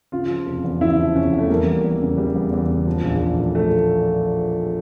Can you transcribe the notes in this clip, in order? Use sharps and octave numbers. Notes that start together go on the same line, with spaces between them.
C#3 F4
F3
F1
E2
C#3 E4
F3
F1 C#4
E2
A3
G3 A#3
E2
E2
C#3
G3
E2
E2
C#3
F3
A#1
A#1
A2
F3 A3